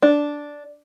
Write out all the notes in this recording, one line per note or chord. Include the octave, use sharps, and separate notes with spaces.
D4